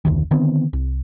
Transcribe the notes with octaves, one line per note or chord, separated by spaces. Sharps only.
F1 D2 D#3
D3 D#3 B3 C4
C2